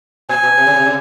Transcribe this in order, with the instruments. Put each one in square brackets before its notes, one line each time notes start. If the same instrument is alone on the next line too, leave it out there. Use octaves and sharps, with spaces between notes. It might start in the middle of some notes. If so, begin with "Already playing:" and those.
[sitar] A#2 [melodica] G#5
[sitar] B2
C3
C#3
C3
C#3